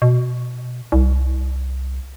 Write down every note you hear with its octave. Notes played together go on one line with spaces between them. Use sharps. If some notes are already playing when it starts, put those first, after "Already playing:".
B2
C2